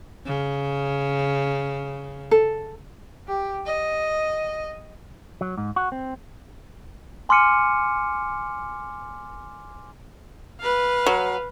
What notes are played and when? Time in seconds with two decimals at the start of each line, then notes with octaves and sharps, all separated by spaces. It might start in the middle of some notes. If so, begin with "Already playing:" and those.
0.26 C#3
2.31 A4
3.28 G4
3.66 D#5
5.41 F#3
5.57 G#2
5.76 F#4
5.92 C4
7.29 G#5 C6 D6 F6 C#7 D#7
10.61 B4 F5
11.06 F#3